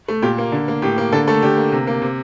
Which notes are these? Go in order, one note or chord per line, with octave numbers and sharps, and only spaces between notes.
A3
A#2 G4
A#3
D3
A#3
A2 G4
A#3
D3 A4
A3 A4
D3 G4
A#3
C3
A#3
C3